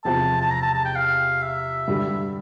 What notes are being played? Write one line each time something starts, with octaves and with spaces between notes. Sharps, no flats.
E2 C3 F3 C4 A5
A5
A#5
A5
A5
G5
F5
E5
G2 D3 G3